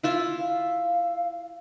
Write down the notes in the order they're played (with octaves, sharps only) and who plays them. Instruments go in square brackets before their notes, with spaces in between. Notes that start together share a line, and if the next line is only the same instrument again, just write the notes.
[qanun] E4 F4 E5
[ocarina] F5